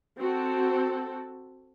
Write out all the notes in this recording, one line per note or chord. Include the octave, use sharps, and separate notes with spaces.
C4 F#4 A4